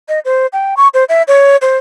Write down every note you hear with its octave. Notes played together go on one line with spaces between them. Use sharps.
D#5
C5
G5
C#6
C5
E5
C#5
C5